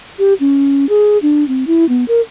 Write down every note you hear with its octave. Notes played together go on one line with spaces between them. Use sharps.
G4
C#4
G#4
D4
C4
E4
B3
A#4